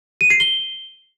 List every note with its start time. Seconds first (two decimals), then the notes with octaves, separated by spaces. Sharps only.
0.21 D#7
0.30 C7
0.40 G7